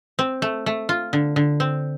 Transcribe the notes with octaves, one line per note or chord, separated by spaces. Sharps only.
C4
A3
A3
F4
D3
D3
C4